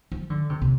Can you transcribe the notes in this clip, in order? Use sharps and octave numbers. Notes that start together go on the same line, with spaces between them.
F3
D3
C3
C3